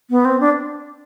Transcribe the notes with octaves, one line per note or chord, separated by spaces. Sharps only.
B3
C4
D4